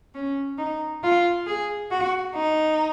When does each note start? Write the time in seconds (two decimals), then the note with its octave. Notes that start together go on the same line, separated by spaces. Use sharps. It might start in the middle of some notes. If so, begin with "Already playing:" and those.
0.14 C#4
0.58 D#4
1.03 F4
1.47 G#4
1.91 F#4
2.35 D#4